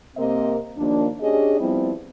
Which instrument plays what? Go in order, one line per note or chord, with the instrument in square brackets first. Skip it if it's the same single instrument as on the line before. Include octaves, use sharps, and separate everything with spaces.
[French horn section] C3 A#3 C4 A#4 D#5
D#2 F3 A#3 D4
C#4 D4 G4 G#4 D#5
F3 G3 B3 C4 E4